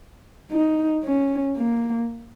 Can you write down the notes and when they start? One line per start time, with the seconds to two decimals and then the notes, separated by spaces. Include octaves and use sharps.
0.51 D#4
1.04 C#4
1.57 A#3